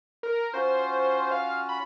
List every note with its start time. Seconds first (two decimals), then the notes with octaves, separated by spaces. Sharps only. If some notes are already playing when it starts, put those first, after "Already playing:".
0.23 A#4
0.54 C#4 F4 F#4 C5
1.31 F5
1.69 B5